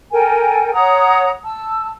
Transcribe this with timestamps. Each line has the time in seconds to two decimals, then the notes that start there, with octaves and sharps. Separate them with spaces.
0.12 A4 A#4 G5 G#5
0.74 C#5 F#5 A#5 D#6
1.45 A5 E6